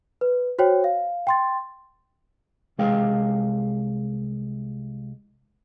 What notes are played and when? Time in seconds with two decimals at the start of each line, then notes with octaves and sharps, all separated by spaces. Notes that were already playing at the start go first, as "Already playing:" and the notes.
0.21 B4
0.59 F#4 C5 C#5 G5
0.84 F5
1.27 G5 C6 A6
2.78 C2 G#3 G#4 F5 G5